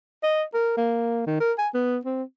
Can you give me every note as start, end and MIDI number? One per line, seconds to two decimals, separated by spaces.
0.23 0.43 75
0.54 0.76 70
0.77 1.26 58
1.27 1.40 51
1.40 1.53 70
1.59 1.69 80
1.74 1.98 59
2.05 2.23 60